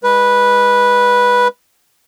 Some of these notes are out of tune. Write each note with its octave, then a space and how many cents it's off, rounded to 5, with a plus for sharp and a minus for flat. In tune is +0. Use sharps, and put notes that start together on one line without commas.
G#3 -25 B4 -10